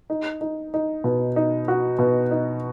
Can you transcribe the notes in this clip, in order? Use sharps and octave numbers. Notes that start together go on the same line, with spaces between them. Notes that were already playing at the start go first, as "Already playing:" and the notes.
D#4
D#4
D#4
B2
D#4
F#4
B2
D#4